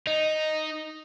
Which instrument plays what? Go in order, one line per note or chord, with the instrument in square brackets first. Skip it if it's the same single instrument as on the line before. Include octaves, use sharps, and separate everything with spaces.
[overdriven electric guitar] D#4